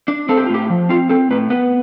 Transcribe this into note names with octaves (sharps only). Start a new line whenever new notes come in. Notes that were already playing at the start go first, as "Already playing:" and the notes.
D4
C4 A4
G4
F4
A2 G4
F3
C4 F4
C4 A4
A2 B4
B3 B4